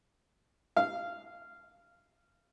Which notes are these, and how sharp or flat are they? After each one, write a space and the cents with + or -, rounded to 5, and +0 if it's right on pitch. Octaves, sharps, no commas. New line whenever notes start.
F5 -15